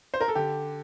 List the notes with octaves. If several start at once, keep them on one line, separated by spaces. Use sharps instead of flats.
C5
A#4
A4
D3 G4